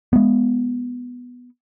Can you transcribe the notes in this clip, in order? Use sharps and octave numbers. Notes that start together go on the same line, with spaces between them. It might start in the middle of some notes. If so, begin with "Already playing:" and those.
G#3 B3